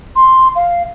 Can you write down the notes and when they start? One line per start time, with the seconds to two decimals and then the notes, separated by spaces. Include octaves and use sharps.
0.16 C6
0.56 F5